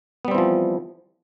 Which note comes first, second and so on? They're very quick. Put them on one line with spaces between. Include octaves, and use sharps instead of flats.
B3 G3 C4 E3 F3